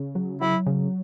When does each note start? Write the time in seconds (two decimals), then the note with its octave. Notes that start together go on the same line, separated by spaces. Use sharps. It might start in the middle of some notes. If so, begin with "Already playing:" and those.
Already playing: C#3
0.15 F#3
0.41 F#3 E4
0.67 C#3